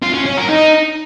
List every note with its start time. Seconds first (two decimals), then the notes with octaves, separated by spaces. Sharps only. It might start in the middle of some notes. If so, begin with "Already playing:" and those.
0.03 F4
0.14 C#4
0.26 C#4
0.37 A#4
0.49 D#4